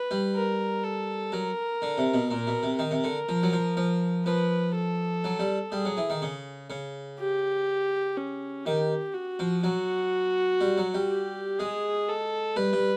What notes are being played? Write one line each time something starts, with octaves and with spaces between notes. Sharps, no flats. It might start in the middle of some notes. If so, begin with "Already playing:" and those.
Already playing: B4
G3
A#4
A4
F#3 A#4
D3
C3
B2
A#2 A#4
B2
C3
D#3 A#4
C3
D3
F3
F#3
F3
F3
F3 B4
A4
F#3
G3
G3 G#4
F#3
E3
D#3
C#3
C#3
G4
C#4
D#3 G4
F#4
F3
F#3 F#4
G3
F#3
G3
G4
G#3 G#4
A4
G3 B4
G3